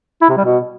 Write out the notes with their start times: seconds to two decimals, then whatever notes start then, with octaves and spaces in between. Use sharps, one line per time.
0.22 E4
0.29 C3
0.37 G3
0.45 B2